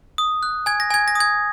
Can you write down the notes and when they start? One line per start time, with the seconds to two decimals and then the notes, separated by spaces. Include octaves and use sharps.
0.18 D#6
0.43 F#6
0.66 G#5 G#6
0.80 A#6
0.91 G#5 G#6
1.08 A#6
1.15 D#6 G#6